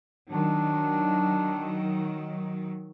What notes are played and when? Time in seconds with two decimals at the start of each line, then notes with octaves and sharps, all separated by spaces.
0.30 D#3 F#3 D4